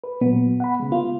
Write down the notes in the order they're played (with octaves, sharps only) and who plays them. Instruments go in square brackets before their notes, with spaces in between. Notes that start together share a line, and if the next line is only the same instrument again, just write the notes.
[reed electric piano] B4
[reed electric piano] A#2 F#3 [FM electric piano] B3
[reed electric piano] F#5 B5
C#3 G#3
[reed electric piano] B3 [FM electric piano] F4